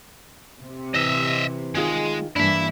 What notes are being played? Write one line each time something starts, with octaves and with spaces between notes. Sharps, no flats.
C3
E3 D#5 E5
D#3 G#3 F4 G#4
G2 E3 A#3 D4 E4 E5